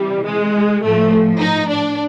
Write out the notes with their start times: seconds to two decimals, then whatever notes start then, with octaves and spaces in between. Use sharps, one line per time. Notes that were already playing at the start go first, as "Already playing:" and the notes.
Already playing: C3 E3 G3
0.25 G#3
0.82 A2 F3 A3
1.40 D#4
1.69 D4